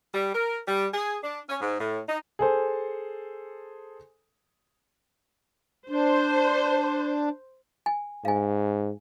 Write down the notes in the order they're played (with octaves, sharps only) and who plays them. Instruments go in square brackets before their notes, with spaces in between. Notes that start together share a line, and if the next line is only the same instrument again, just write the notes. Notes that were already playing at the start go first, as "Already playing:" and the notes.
[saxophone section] G3
A#4
G3
G#4
D4
C#4
G#2
A2
D#4
[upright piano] G#4 A4 C5
[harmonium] D4 [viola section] C5
[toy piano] G#5
[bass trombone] G#2 [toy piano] F5 G#5